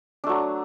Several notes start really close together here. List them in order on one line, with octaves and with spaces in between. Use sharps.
D4 A3 F#3